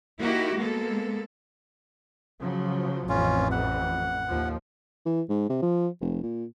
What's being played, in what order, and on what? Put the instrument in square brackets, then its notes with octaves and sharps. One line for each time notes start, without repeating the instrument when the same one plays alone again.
[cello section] A#3 D#4 E4 F#4 G4
G#3 A#3 B3 A4
[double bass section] C#3 F3 F#3
[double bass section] A1 F2 E3 [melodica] C#4 F4
[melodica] F#5
[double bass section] D#2 F3
[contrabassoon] E3
G#2
C3
F3
F1
A#2